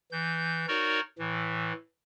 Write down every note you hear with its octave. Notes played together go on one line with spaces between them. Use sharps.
E3 G6
D#4 F#4 A#4 C#5 D5
A2 E3